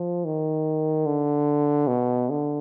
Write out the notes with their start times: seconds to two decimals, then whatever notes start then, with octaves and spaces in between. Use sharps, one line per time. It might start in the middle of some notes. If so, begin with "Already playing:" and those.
Already playing: F3
0.25 D#3
1.06 D3
1.88 B2
2.30 D3